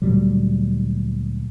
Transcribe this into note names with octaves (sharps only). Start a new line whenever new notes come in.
D2 A#2 F#3 G3